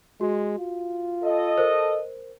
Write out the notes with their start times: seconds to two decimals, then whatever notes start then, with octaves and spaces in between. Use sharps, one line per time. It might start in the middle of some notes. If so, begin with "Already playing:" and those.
0.21 G#3 F#4
0.59 F4
1.24 A4 D#5
1.58 A#4 C5